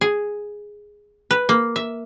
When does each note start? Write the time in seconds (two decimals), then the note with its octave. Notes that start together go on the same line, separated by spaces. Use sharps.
0.01 G#4
1.31 B4
1.49 A#3
1.76 E5